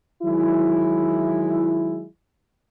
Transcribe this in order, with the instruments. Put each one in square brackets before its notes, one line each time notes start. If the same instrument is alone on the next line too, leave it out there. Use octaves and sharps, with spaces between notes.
[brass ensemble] D#3 F#3 G#3 E4